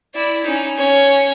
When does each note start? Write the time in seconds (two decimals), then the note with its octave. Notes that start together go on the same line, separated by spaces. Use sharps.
0.14 E4 D5
0.44 C#4 D#4
0.78 C#4 C#5